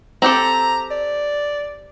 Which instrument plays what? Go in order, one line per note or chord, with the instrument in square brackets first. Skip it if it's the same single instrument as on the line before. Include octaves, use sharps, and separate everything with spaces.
[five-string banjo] C4 G4 A4 [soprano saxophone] A#5
[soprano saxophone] D5